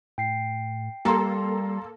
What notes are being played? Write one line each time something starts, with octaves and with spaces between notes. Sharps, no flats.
A2 G5 C7
G3 A#3 A4 A#5 C6